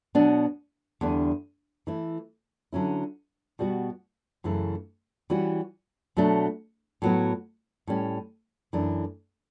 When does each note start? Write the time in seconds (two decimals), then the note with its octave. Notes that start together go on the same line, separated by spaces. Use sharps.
0.15 B2 F#3 B3 D4
1.01 E2 D3 G3 B3 D4
1.87 E3 A3 E4
2.73 D3 F#3 C#4 E4
3.59 B2 G3 B3 F#4
4.44 F#2 C#3 E3 A3
5.30 E3 G3 C#4 F#4
6.17 B2 F#3 A3 D4
7.02 A2 F#3 B3
7.87 A2 G3 C#4
8.73 F#2 E3 A3 D4